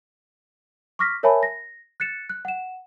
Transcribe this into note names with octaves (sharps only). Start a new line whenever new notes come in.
C#6 D6 F6 A#6 B6
A#4 C#5 E5 G#5 A5 B5
A#6
F#6 A6 C#7 E7
F#6
F#5 E7